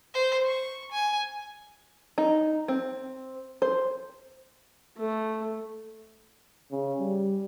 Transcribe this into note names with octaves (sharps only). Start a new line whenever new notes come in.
C5
C#6
G#5
D#4
C4
C5
A3
C#3
G3